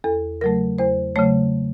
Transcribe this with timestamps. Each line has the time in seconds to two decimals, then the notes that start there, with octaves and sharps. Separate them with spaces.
0.04 E2 A4
0.41 C#3 F#3 A3 A#4
0.79 E2 C5
1.16 C#3 F#3 A3 C#5